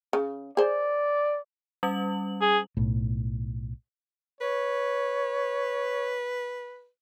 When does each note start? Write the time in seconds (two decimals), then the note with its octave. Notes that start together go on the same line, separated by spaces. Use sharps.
0.13 C#3
0.57 G#4 C5 D5
1.83 G3 C#4 F#7
2.42 G#4
2.77 B1 A2
4.41 B4 C#5